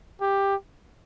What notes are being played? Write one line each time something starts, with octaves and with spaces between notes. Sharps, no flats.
G4